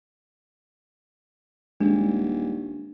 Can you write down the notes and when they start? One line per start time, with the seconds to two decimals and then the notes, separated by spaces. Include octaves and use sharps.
1.80 D#1 G#3 D4